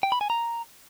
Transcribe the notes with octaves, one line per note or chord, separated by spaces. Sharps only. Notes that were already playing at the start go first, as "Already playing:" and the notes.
G5
B5
G#5
A#5